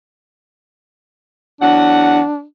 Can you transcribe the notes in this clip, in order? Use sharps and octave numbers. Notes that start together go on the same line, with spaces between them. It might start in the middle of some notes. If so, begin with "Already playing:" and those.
E2 F#3 D4 F#5